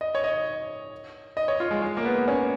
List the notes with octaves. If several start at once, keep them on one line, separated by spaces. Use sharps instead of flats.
D#5
C#5
D#5
D#5
C#5
F4
G#3
G#3
A#3
B3
C#4